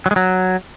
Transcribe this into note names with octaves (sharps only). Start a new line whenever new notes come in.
F#3
G#3
F#3